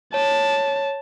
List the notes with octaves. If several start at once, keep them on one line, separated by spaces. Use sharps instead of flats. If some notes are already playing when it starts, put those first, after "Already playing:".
C#5 A5